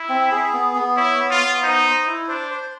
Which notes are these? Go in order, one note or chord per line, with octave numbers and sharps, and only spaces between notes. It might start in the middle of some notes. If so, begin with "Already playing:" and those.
Already playing: E4
C4
G#4
B3
B3
E4 C#5
B3
F4
B3
D#4 C5
C5
E4
D4 C5
C5